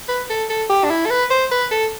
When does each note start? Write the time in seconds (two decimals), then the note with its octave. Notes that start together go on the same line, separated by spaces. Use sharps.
0.08 B4
0.30 A4
0.50 A4
0.70 G4
0.84 D4
0.91 E4
1.06 A4
1.10 B4
1.31 C5
1.51 B4
1.71 A4